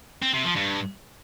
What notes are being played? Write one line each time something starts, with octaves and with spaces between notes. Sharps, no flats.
C4
C3
F3
G2